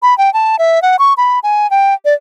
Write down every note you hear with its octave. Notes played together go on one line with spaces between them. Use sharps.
B5
G5
A5
E5
F#5
C#6
B5
G#5
G5
D5